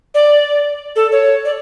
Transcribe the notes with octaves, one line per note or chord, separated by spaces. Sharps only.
D5
A4
C#5
D5